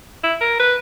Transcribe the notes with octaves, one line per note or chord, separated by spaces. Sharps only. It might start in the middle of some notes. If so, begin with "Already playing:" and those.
E4
A#4
B4